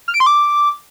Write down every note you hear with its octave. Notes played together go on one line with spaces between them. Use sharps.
F6
D7
C6
D6